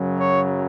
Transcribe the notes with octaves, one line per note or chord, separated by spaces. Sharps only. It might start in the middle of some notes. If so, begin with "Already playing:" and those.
Already playing: F#2 C#3 F#3
C#5